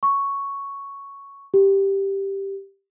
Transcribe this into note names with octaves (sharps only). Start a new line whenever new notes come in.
C#6
G4